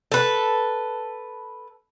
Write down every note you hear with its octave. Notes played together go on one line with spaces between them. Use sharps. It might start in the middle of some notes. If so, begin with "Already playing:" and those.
A4 B4